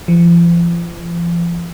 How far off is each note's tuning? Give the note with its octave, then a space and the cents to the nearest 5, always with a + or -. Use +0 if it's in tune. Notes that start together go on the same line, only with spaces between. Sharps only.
F3 -40